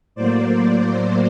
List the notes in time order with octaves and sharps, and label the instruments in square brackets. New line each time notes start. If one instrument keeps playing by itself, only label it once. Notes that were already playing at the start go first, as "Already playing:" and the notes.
[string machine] A2 F#3 A#3 C5 D5